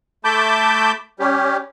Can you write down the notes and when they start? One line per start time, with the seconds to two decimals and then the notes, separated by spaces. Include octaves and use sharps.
0.25 A3 A5 B5 D6 G6
1.20 G3 C#4 G4